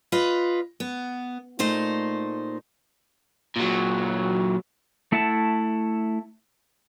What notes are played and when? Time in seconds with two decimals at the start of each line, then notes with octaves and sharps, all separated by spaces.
0.12 F4 B4 D#5
0.80 B3
1.59 A#2 A3 D#4 C5
3.56 A#2 F#3
5.12 A3 E4 E5 F#5 A5